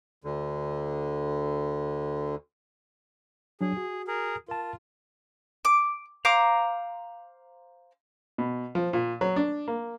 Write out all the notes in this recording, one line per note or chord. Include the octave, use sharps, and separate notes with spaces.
D2 D3
F#3 D4 G#4
F#4
G#4 A#4
F4 A#4 A5
D6
C5 F5 A#5 D6
B2
F3
A#2
F#3
D4
A#3